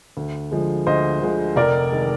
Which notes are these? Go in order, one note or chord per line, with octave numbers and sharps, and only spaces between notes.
D2
D3 F3 G#3
D2 C5 D#5
D3 F3 G#3
F1 A#4 D5
D#3 G#3